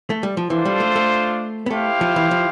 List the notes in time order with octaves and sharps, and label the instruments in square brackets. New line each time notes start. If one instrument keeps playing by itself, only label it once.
[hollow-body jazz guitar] A3
G3
F3
[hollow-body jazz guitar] E3 [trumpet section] D4 F4 A4 C5
[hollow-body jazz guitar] G3
A3
A3
B3
[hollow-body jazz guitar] A3 [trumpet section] E4 G4 C5 F5
[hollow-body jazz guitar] F3
E3
F3